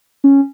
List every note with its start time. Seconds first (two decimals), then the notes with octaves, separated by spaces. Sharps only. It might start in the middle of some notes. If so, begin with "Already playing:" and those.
0.24 C#4